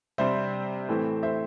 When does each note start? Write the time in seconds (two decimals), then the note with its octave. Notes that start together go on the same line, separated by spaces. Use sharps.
0.18 C3 G3 C4 C5 E5
0.89 A2 E3 A3 C4
1.23 C5 E5